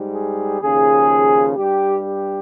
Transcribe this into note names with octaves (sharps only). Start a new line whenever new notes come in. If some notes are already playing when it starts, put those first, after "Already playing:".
Already playing: G#2 G3
G#4
D#2 C#3 F3 G#4
G2 G3 G4
G4